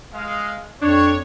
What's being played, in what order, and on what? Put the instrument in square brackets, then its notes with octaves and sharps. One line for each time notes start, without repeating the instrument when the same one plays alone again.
[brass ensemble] G#3 F5
[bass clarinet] F2 [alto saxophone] D4 [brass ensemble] C#5